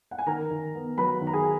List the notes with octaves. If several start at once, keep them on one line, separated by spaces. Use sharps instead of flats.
F#5
G#5
D#3 A#4 A#5
D#3
B3
F#3 B4 B5
D#3
A#5
G#4 G#5